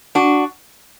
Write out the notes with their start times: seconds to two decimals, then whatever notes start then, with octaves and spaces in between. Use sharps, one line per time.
0.15 D4 F#4